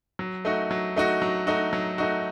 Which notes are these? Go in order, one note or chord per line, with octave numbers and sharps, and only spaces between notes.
F#3
A3 D#4 F#4
F#3
A3 D#4 F#4
F#3
A3 D#4 F#4
F#3
A3 D#4 F#4